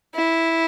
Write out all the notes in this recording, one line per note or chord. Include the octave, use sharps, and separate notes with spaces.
E4